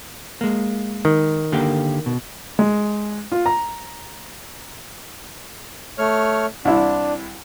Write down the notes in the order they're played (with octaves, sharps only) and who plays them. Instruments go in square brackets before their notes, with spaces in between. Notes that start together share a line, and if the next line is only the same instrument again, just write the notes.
[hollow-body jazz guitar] G#3 A#3
[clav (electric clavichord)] D#3
[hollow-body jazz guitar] D3 A#3 G4
B2
[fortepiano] G#3
F4
A#5
[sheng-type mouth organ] A3 C#5 F6
[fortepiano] C2 E4 [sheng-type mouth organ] D4